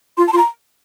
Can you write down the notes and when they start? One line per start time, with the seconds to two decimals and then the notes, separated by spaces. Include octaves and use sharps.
0.17 F4 C6
0.27 A5
0.33 F4 C6
0.38 A#5